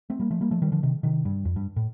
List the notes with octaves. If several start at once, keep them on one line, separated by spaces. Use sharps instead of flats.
A3 C4
G3 A#3
F3 A3
G3 A#3
F3 A3
D#3 G3
D3 F3
C3 D#3
C3 D#3
G2
F2
G2
A2